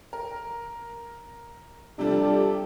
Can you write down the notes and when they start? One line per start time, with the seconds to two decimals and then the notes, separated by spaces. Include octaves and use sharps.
0.13 A#4
1.99 C3 F3 G3 D4 G4 A4